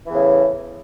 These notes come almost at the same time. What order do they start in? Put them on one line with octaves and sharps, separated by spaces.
E3 E2 C#3 A2